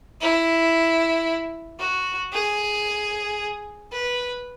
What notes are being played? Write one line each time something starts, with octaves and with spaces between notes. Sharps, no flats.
E4
F#4
G#4
B4